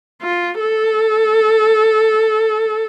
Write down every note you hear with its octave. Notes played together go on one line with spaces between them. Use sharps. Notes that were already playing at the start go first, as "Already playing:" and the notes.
F4
A4